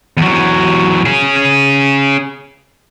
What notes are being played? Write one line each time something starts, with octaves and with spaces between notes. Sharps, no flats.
E2 F#3
C#4 G#4